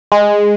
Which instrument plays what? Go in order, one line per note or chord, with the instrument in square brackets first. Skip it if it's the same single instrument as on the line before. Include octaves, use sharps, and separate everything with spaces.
[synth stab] G#3